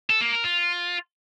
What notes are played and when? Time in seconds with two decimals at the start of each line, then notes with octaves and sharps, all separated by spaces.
0.10 A4
0.21 A#3
0.33 A#4
0.44 F4